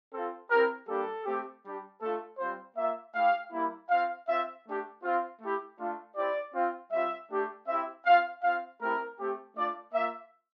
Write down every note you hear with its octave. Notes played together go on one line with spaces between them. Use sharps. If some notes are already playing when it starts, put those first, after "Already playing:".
C4 F4 A4
C4 E4 G4 A#4
G3 A#3 D4 G4 A4
A3 C4 G4
G3 D4 G4
A3 D4 F4 A4
G3 C4 F4 C5
A#3 F4 E5
A3 E4 G4 F5
G3 A#3 E4
C4 F4 F5
C4 F4 E5
A3 D4 G4
C4 F4
A3 E4 G4
A3 D4 F4
C4 E4 G4 D5
C4 F4
G3 C4 F4 E5
A3 D4 G4
C4 E4 G4 E5
C4 F4 F5
C4 F4 F5
A3 C4 E4 G4 A#4
A3 C4 G4
A3 D4 F4 D5
A#3 F4 E5